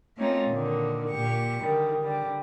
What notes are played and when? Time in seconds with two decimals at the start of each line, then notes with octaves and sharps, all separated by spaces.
0.17 A3 A#3 C4 C#4 D#4 F4
0.48 A#2 D3 D#3
1.10 A#2 G4 C#6
1.59 D3 D#3 G3
2.02 D3 G3